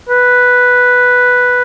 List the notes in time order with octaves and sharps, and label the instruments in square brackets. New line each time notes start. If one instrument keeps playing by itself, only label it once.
[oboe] B4